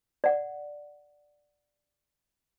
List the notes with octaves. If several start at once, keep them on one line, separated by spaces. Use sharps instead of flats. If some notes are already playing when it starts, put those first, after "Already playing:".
D5 F#5